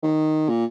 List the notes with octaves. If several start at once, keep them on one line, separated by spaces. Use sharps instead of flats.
D#3
A#2